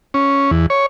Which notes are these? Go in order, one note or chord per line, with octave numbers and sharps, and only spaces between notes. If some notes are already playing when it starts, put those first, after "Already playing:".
C#4
E2
C#5